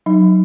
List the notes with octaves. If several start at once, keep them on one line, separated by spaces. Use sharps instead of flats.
F#3 D#4